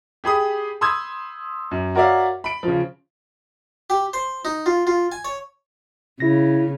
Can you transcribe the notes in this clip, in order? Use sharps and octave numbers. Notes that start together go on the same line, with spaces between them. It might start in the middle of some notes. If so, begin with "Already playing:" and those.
G4 G#4 B5 D#6
B5 C6 D#6 E6 G6 G#6
F#2
F#4 A#4 C#5 D5 E5 F5
B5 D7
C#3 F3
G4
C5
D#4
F4
F4
G#5
C#5
C#3 E4 A#6